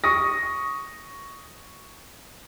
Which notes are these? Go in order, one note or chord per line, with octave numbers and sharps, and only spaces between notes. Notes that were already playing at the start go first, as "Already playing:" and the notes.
C#6 D#6 A#6